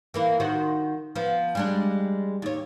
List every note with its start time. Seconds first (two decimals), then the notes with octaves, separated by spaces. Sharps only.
0.14 E3 A#3 E4
0.40 D#3 F#4 C5
1.16 F3 B3
1.55 G3 G#3 D4
2.42 D#2 C#5